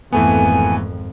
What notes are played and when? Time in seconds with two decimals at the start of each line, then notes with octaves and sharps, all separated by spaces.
0.12 G#1 F2 E3 A3 B3 G#5